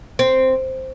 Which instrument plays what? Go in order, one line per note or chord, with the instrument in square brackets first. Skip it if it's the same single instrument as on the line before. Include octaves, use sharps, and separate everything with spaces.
[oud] C4